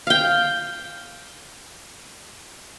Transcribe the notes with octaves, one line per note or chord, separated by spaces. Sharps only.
F5 G5